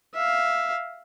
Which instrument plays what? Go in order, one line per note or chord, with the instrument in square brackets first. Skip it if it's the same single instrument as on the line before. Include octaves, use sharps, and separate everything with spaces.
[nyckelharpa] E5 F5